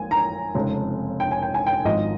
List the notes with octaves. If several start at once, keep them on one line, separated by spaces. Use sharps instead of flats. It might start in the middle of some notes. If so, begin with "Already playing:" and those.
Already playing: A#1 G#3 G#5
A#5
F1 F2 C#3 G#3 C4
G5
G#5
G5
G#5
G5
G#1 G#2 F3 D#5